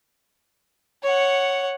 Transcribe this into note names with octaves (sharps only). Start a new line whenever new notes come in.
C#5 F#5